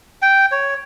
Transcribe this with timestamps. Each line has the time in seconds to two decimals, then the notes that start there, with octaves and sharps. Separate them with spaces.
0.22 G5
0.52 C#5